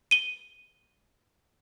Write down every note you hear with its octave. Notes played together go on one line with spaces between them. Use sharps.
D#7 G7